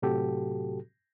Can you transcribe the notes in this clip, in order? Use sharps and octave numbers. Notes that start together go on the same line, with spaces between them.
A2 C3 F#3 F#4 G4 A4